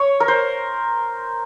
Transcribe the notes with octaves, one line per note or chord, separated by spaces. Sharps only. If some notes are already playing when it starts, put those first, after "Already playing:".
Already playing: C#5
A#4
C5